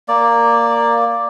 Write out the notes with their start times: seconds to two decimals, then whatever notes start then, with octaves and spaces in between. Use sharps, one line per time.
0.08 A#3 D5